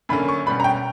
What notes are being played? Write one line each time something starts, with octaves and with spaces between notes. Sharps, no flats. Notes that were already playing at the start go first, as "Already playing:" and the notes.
F#2 D3 A#3 C#4 B5
C#6
B2 G3 C#4 B5
A#5
G5